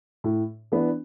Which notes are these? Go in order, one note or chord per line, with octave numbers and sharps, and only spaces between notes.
A2
E3 B3 D4